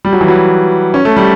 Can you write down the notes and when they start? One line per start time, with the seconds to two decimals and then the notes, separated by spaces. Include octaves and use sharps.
0.05 G3
0.13 F#3
0.21 E3
0.28 F#3
0.94 C#4
1.05 A3
1.16 G3